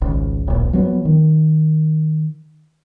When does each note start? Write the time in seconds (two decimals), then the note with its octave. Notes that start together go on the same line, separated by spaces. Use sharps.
0.01 G#1 C#2
0.48 D1 A#1
0.73 F3 F#3 B3
1.05 D#3